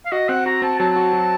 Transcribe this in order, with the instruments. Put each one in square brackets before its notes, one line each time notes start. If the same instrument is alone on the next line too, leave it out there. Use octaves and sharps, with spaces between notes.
[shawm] F5
[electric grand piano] F#4 [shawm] D#5
[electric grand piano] C4 [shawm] F#5
[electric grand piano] F#4 [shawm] A#5
[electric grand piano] C4 [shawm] A5
[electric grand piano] F#3 [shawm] A5
[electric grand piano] F#4
F#3